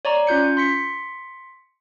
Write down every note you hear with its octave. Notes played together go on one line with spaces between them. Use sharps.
C#5 D5 A#5 C#6
C#4 F4 G6 C#7
C6 B6 C#7